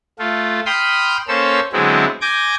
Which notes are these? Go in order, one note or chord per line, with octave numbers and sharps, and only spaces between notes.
A3 F4
G5 B5 C6 D#6 F6 G6
A#3 C#4 A4 C5 C#5 E6
D3 F#3 G#3 B3 C4 E4
G#5 D6 G6 G#6 A#6